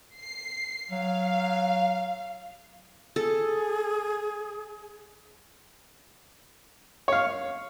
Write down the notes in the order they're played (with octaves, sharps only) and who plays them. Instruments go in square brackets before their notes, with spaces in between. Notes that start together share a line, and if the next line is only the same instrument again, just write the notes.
[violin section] C7
[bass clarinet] F#3 [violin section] F5
[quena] G#4 [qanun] A4
[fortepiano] C#5 F5